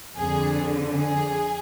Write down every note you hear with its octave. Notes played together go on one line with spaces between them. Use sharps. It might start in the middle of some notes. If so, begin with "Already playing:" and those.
F2 D3 G#4
G#4